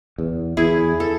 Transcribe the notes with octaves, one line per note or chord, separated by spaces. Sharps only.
E2
E2 E4 G#4
A4